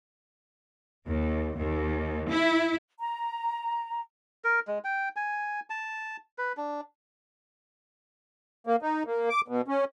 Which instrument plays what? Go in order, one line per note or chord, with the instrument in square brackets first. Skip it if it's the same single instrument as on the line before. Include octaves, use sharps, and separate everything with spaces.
[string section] D#2
D#2
E4
[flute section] A#5
[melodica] A#4
G#3
G5
G#5
A5
B4
D4
[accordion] A#3
D#4
A#3
D6
B2
C#4